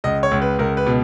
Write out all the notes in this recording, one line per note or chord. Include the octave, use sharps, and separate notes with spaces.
C#2 D#5
C#5
C#2
B4
C#2 A#4
B4
B2